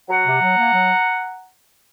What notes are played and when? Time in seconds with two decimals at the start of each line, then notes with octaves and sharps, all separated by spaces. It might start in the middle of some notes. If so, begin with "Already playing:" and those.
0.09 F#3 F#5 A#5
0.25 C3
0.42 F#3
0.57 A#3
0.74 F#3